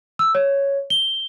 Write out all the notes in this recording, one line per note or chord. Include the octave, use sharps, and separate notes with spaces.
E6
C#5
G7